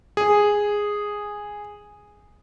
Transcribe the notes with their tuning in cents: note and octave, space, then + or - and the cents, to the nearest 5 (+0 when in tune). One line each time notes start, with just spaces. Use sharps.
G#4 -5